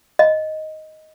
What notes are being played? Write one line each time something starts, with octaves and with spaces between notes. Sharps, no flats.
D#5